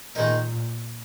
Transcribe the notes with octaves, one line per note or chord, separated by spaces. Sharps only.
A#2 D#3 G#3 D#4 A#4